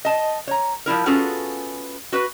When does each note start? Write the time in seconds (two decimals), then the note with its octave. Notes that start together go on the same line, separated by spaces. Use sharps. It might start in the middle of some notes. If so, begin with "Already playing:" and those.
0.05 D#5 A5
0.47 C#5 A#5
0.86 F3 G3 E4 A#4
1.06 B3 C#4 F4 F#4 G#4 A4
2.12 F#4 B4